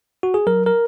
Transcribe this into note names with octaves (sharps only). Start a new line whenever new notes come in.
F#4
G#4
F#3 A#4
A#4